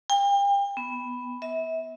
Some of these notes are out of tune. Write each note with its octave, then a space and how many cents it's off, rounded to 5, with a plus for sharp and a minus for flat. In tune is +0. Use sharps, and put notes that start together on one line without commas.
G5 +35
B3 +5
E5 -30